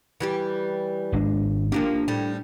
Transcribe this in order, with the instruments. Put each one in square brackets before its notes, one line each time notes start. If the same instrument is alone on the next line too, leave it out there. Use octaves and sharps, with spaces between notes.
[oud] E3 G3 G4
[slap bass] G#1 G#3 D4
[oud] F3 A#3 G4 [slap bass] C#4 D4
[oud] A2 G3